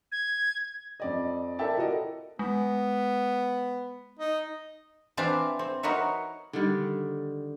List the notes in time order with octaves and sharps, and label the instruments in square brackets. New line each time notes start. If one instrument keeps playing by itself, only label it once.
[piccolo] G#6
[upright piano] F2 D5 D#5
A4 A#4 D5 E5 G5 A5
E4 F#4 A4 A#4 D#5
[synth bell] G#3 [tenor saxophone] B3
[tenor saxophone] D#4
[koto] E3 C4 D4 D5 E5 F5
C4
D#4 F#4 A#4 B4 C#5 E5
[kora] D3 D#3 G3